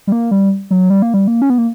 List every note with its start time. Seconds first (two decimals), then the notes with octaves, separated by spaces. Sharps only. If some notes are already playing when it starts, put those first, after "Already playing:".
0.07 G3
0.12 A#3
0.31 G3
0.71 F#3
0.90 G3
1.02 A#3
1.14 G3
1.27 A#3
1.42 C#4
1.50 B3
1.58 A#3